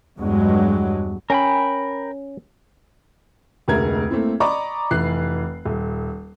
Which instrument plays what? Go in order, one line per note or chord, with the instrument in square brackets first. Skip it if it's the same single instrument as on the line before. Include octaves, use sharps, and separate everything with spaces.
[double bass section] E2 G2 F#3 G#3
[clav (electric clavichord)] C#4 [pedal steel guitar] A#4 G5 B5
[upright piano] F1 D2 G#3 A#4 G#6
A3 A#3 C4 E4
D5 D#5 A#5 B5 C#6 D6
F1 E3 F#6 C7
D#1